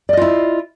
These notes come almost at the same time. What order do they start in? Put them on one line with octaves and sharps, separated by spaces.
D5 D#5 F4 E4